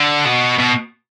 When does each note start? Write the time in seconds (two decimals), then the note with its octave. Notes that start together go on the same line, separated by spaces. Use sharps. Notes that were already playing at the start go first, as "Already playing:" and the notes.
Already playing: D3
0.26 B2
0.59 B2